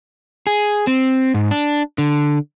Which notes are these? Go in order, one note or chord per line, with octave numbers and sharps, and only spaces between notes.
G#4
C4
G#2
D4
D3